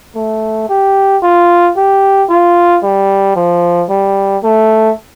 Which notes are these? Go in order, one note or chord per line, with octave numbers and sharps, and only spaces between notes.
A3
G4
F4
G4
F4
G3
F3
G3
A3